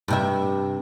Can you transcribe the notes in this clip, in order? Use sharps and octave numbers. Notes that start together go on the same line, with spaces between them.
G2 C3 E5